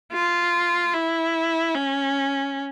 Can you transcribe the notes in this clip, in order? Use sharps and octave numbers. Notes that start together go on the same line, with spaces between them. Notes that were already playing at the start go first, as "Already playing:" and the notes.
F4
E4
C#4